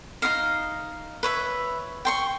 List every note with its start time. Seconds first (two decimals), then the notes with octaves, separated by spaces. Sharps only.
0.22 D#4 E4 D#5 F5
1.23 B4 C#5 E5
2.05 G5 C6 C#6